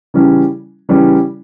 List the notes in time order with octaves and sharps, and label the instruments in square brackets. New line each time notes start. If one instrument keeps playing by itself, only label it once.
[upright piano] C#3 E3 G3 C#4
C#3 E3 G3 C#4